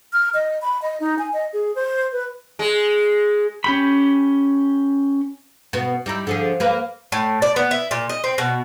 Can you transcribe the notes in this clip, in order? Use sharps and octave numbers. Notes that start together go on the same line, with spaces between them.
F6
D#5
B5
D#5
D#4
G#5
D#5
G#4
C5
B4
G#3
C#4 G4 B5
B2 B3
G3 D#4 E4
D3 F3 G#4
A#3 B4
A2
D5
B3
E4
A#2
D#5
C4
B2